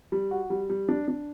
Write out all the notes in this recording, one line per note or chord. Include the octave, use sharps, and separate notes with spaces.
G3
F#4
G3
G3
D4
D4